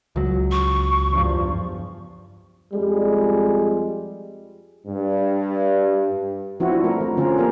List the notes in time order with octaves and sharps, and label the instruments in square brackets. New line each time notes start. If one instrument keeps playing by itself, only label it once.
[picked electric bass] C#2 F#3
[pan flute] C#6
[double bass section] E2 G2 F3
[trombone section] F2 G3 G#3
G2
[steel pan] F3 C4 E4 F#4
D4
A3 A#4
F3
D3 C4 C#4 F4 A#4
A#3 G4 A#4